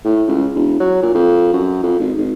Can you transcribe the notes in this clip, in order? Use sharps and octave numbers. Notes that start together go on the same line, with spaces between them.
A2
C#2
E1
F#3
A#2
F2
F#2
F2
G#1
G#1